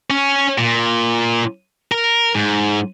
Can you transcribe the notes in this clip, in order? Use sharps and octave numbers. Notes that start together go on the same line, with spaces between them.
C#4
A#2
A#4
G#2